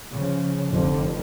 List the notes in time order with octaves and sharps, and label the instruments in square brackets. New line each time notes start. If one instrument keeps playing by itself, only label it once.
[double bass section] C#3 F3
F1 F2 D3 F3